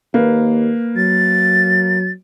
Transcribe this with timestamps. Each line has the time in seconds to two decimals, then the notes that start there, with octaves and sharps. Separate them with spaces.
0.14 D#2 A#3 B4
0.96 F#3 A6